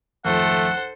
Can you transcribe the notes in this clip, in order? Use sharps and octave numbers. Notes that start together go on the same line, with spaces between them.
G#1 F2 F3 A3 A4 C5 F#5